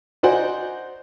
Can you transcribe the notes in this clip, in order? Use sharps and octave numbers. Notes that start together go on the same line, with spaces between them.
D#4 F#4 C5 D5 F#5 G#5